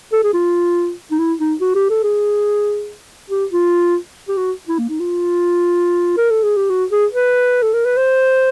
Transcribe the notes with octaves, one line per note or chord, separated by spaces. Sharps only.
A4
G#4
F4
D#4
E4
D#4
F#4
G4
A4
G#4
G4
F4
G4
F#4
E4
A#3
D#4
F4
A#4
A4
G#4
G4
F#4
G#4
B4
A4
A#4
B4
C5